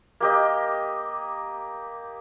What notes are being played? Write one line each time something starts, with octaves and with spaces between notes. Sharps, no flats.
A#3 G4 D#5